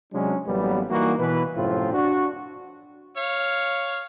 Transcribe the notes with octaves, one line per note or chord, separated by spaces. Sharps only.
C3 F#3 G#3 C#4 D4
A1 F#3 G3 A#3 B3
E3 G3 A#3 D#4 F#4
B2 E3 B4
F#2 A2 C3 F3 C4 F4
D4 F#4
C#5 F5